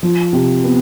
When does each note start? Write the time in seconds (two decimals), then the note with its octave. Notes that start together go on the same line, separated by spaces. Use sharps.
0.03 F3
0.33 C3
0.64 B3